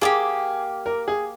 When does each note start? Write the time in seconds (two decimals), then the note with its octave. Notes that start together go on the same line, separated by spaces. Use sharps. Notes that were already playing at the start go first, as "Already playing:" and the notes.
0.01 A#3 D4 G4 G#4
0.86 A#4
1.08 G#4